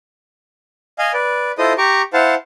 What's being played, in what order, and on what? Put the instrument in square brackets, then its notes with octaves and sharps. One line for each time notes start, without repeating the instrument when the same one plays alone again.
[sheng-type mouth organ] D#5 F5 G#5
B4 D5
E4 F4 A4 C5 D#5 D#6
G4 A#5 C#6 D6
E4 C5 F5 F#5 A5